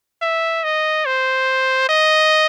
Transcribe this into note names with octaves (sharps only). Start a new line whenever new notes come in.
E5
D#5
C5
D#5